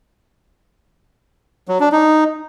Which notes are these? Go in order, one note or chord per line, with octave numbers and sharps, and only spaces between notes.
F#3
D4
D#4